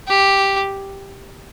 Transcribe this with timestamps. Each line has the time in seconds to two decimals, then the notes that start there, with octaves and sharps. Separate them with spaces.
0.08 G4